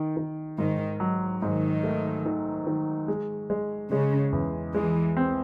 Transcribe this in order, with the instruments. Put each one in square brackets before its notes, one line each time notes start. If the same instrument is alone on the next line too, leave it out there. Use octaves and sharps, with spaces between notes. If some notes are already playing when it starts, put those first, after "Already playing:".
Already playing: [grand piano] D#3
D#3
[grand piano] G#2 [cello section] D#3
[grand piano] F#3
[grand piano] G#2 [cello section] D#3
[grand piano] A3
D#3
D#3
G#3
G#3
[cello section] C#3 [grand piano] G#3
[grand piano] E2
[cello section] E3 [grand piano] G#3
[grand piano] C4